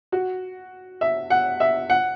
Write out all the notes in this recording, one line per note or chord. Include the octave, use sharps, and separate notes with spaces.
F#4
E5
F#5
E5
F#5